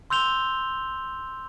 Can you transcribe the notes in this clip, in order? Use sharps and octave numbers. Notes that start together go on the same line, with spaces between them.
C6 E6 G6 F7 G7